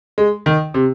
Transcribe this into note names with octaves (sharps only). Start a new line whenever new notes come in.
G#3
D#3
C3